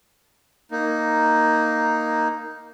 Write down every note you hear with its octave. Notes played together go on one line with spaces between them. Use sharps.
A#3 D#4